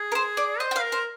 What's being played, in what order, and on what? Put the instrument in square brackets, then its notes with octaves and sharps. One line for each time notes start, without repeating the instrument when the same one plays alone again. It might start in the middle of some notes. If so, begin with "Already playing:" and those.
Already playing: [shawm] G#4
[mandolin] A#4
C5
D5
[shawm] C5 [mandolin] D#5
[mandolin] G5
F5
[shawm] A#4
[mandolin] C5